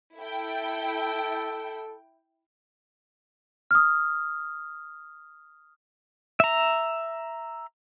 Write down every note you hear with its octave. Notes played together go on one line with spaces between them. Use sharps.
E4 A4 G5
D#6 F6
E5 A#5